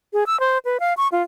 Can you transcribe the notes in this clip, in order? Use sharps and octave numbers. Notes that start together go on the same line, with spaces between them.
G#4
E6
C5
B4
F5
C#6
F4